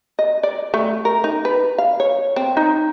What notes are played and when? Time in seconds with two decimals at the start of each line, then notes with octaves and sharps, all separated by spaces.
0.19 D#5
0.43 D5
0.74 A3
1.05 A#4
1.24 D#4
1.45 B4
1.78 F5
2.00 C#5
2.36 C4
2.57 D#4